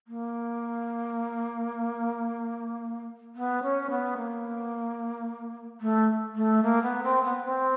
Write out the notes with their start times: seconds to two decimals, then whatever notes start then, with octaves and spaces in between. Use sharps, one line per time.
0.07 A#3
3.35 B3
3.62 C#4
3.89 B3
4.16 A#3
5.80 A3
6.35 A3
6.62 A#3
6.82 B3
7.03 C4
7.23 B3
7.44 C4